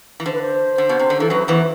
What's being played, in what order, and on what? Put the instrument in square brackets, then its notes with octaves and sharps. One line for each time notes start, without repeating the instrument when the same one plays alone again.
[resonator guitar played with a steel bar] E3
[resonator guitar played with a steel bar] D3 [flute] C5
[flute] B4
C5
[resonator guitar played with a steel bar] D3
B2
C3
D3
[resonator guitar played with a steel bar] E3 [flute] A4
[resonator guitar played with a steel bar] F#2 F#3 [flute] B4
[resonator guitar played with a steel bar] E2 E3 [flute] B4